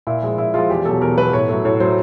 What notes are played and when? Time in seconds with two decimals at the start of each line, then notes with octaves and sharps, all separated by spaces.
0.07 A#2 E4
0.23 F3 G#3
0.38 A#2 E4
0.54 F3 G#3 F4
0.69 E2 G4
0.85 B2 F#3 A4
1.01 E2 A#4
1.17 B2 F#3 B4
1.33 A2 C#5
1.49 F#3 A3
1.65 A2 C#5
1.80 F#3 A3 C5